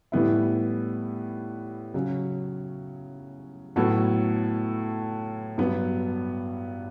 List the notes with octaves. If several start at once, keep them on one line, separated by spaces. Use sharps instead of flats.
A2 E3 G3 B3 E4
C#3 F#3 C#4
A2 F#3 B3 F#4 A4
G2 F#3 B3